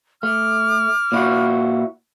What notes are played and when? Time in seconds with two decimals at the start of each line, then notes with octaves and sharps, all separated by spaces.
0.23 A3 D6 F6
1.12 A#2 E4 F#4